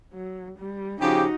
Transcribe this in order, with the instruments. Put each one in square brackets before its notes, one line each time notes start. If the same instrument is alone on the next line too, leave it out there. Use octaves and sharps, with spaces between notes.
[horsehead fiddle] F#3
G3
[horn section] C#3 F3 G4 [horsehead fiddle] D#4 F#4